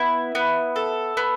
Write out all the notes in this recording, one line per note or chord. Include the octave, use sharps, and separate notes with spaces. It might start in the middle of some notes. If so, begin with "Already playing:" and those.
Already playing: B3 E4
B3
A4
B3